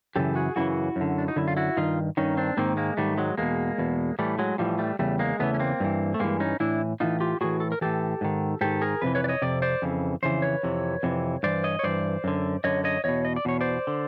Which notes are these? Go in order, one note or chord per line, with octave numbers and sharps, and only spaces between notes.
F#2 C#3 E3 G4 A4
F#4 G#4
F#2 C#3 E3 E4 F#4
F#2 D3
D4
D#4
F#2 D3 E4
F4
E4 F#4
G2 D#3 D#4 F4
G2 D#3 C#4 D#4
C4 D4
G#2 D#3 A#3 C4
G#3 A#3
G#2 D#3 G3 A3
F#3 G#3
E2 B2 G#3 A#3
E2 B2
A2 E3 G3 A3
F#3 G#3
A2 E3 F3 G3
G3 A3
E2 C#3 G3 A3
G#3 A#3
E2 C#3 E3 A3 B3
C#4
A#3 C4
G2 E3
A3
G2 E3 G#3 A#3
C#4 D#4
A2 E3 D4 E4
A2 E3 D#4 F4
F4 G4
A2 E3 F#4 G#4
A4
A#4
A2 E3 G4 A4
G#2 D#3
G#2 D#3 G4 A4
G#4 A#4
F2 C3 E3 B4
B4 C#5
D5
C#5 D#5
F2 C3 D5
C5 D5
F2 C#3 E3
F2 C#3 E3 C5
B4 C#5
F2 C3 E3
F2 C3 E3
G2 E3 C5 D5
C#5 D#5
C#5
G2 E3 C5 D5
F#2 D3
F#2 D3 C#5 D#5
C#5 D#5
E2 B2 C#5 D#5
D#5
D5
E2 B2 C#5
C5 D5
D3